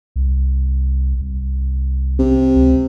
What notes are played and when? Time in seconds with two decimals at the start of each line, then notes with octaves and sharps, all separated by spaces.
0.16 C2
1.21 C2
2.19 C3
2.56 C#2